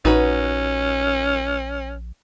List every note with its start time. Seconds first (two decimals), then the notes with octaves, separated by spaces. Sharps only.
0.05 A#1 C#4 D#4 F#4 B4